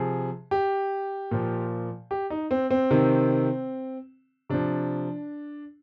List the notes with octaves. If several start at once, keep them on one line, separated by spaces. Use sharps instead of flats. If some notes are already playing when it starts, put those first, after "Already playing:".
Already playing: C3 F3 G#4
G4
A#2 F3
G4
D#4
C4
C4
C3 D#3
C3 F3 D4